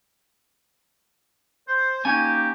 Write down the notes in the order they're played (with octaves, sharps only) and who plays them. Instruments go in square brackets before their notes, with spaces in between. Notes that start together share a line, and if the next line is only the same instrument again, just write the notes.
[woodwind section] C5
[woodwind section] A#3 D#4 G4 [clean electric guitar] C#4 G#5